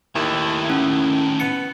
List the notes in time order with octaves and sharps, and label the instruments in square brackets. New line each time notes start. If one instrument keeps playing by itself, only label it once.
[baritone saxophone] D#2 [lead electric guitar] A2 D#3 [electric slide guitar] E4
[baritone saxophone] D#2 [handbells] C#4
[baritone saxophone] B3 [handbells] C#7